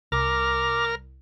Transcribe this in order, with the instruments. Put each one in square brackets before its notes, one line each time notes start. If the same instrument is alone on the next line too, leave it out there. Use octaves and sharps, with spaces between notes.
[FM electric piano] C2 [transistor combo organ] A#4 F6 [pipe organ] D6